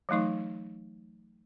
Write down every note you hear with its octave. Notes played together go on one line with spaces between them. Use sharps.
E3 F#3 A3 D#4 C#6